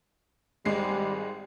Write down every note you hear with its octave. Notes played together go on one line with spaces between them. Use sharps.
G#1 G3 G#3 C7